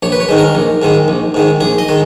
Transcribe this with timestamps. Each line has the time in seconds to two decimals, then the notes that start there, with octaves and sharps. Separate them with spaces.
0.03 A#1 C#5
0.12 B4
0.20 C#5
0.29 G#2 D#3 G#3
0.38 A#4
0.55 A#1
0.82 G#2 D#3 G#3
1.08 A#1
1.34 G#2 D#3 G#3
1.60 A#1 G#4
1.78 D#5
1.89 D#3 G#3